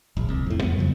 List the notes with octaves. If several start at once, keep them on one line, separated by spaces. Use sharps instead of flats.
D1 A#1
C2
F2 A2
F2 G3 B3
F2 C#3 F3